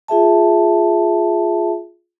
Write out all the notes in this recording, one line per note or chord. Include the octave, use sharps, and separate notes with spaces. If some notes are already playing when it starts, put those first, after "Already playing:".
F4 G#4 E5 A5